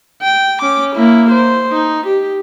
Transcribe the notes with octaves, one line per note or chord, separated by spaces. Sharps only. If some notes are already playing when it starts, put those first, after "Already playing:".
G5
C#4 D6
A#3 E4
C5
D#4
G4